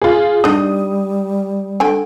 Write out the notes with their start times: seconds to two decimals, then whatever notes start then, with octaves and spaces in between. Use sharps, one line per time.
0.02 F4 G#4
0.44 G3 D4 D#4 D#6
1.80 D3 G5 G#5